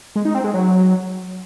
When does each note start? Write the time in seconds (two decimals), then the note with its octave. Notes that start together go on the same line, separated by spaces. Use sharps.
0.16 G#3
0.25 D#4
0.35 C4
0.44 G#3
0.54 F#3